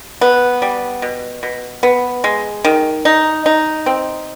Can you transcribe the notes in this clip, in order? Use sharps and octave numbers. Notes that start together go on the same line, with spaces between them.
B3
G3
B2
B2
B3
G#3
D#3
D#4
D#4
C4